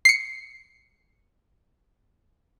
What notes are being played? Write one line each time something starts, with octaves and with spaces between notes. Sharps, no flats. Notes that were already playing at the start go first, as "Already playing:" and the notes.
C7 C#7